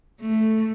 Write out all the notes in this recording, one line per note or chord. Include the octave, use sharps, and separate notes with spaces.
A3